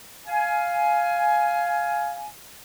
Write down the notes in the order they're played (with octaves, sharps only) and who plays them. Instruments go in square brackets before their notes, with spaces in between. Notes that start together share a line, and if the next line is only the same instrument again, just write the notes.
[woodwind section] F5 G#5